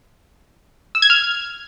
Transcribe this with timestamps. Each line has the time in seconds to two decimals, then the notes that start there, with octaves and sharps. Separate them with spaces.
0.95 E6
1.02 G#6
1.10 F6